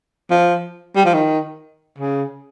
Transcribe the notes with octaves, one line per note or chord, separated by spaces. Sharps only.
F3
G3
F3
D#3
C#3